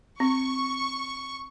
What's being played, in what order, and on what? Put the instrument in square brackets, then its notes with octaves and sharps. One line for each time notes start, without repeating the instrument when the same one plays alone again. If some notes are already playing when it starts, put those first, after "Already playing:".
[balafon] C4 [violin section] C#6